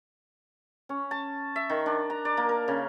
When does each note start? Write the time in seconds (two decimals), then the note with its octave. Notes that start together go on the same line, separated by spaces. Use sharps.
0.89 C#4
1.11 A5
1.56 E5
1.70 D#3
1.86 D4
2.10 A#5
2.25 D5
2.37 A#3
2.49 A#4
2.68 C#3